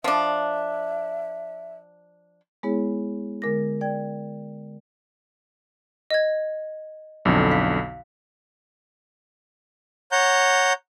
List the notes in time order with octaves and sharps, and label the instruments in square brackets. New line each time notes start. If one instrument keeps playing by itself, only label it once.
[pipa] F3 D4 [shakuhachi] E5
[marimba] G#3 B3 E4 G#4 C#5
D3 G#3 A#4 D6 A#6
D5 G5 G#6
[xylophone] D#5 G#6
[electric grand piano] B1 F2 D3
[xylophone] F5 B6
[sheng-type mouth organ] C#5 F#5 A#5 G6